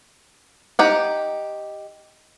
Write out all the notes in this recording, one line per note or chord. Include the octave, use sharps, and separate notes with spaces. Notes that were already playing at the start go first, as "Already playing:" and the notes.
D#4 G4 F#5